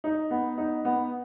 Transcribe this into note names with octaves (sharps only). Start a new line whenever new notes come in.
D#4
B3
D#4
B3